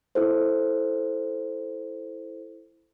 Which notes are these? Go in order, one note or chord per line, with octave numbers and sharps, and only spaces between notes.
E4 A4 C5